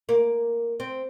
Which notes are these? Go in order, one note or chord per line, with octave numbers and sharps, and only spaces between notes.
A#3
C4